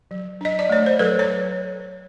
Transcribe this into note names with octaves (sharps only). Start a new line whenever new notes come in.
F#3
D4 D#5
D5
A3 C#5
C5
F#3 A4 B4
C#5